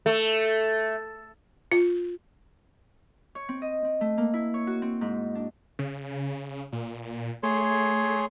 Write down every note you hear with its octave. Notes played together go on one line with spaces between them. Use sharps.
A3
F4
C#5
C4
D#5
C4
A3
A#3
E4
C#5
F#4
C4
G#2
D4
C#3
A#2
A3 G#4 C#5 C6